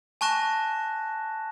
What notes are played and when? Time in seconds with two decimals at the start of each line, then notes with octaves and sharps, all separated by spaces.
0.21 G#5 A5 C#6 F#6 A#6 E7